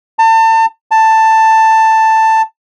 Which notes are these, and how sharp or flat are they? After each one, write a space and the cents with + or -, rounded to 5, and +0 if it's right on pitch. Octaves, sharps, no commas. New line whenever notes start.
A5 +35
A5 +10